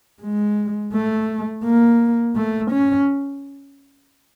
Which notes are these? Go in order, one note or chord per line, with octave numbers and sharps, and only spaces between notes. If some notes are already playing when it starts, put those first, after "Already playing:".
G#3
A3
A#3
A3
C#4